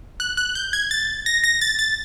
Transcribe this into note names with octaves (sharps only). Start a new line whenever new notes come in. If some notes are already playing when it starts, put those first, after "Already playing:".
F#6
F#6
G6
G#6
A6
A#6
A#6
A6
A6